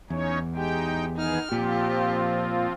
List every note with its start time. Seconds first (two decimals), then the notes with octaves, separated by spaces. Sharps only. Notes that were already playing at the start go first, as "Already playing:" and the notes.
0.10 E2 C#4 D#4 C#5
0.55 G#3 D#4 G4 G5
1.17 D#3 B3 D#4 G#4 F6
1.52 A#2 F3 C4 F4 G4